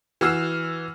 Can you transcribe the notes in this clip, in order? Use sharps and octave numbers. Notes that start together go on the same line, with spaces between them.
E3 F#4 E6 F6 C7 E7